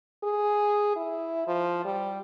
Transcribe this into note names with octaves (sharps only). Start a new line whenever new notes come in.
G#4
E4
F3
G3